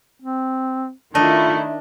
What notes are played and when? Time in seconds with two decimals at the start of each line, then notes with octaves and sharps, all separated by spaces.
0.22 C4
1.15 D#3 A3 D4 E4 F4 D#5